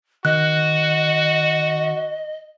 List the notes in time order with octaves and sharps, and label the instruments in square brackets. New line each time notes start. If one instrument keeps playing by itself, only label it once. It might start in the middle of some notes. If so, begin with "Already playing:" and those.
[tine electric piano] D#3 [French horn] F#4 [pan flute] D#5 [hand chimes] F#6